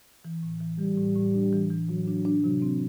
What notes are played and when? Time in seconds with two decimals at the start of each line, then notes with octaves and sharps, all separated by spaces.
0.25 E3
0.43 A2
0.60 E3
0.78 E3 G3
0.97 A2
1.16 A2
1.34 D4
1.53 E3
1.70 E3
1.89 A2 F#3
2.07 D4
2.25 D4
2.44 C3 F#3
2.62 C4